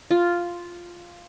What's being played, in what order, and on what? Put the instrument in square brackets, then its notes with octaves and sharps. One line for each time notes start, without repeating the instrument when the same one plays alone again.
[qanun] F4